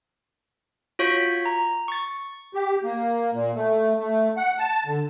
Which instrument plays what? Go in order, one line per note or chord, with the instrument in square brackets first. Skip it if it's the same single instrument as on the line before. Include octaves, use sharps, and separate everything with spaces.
[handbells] F4 F#4 C#5 C#6 G6 B6
A#5
C#6 A6
[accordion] G4
A#3
A#2
A3
A3
F#5
A5
D3